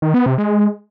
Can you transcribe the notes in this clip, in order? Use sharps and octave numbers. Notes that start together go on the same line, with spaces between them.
D#3
B3
C3
G#3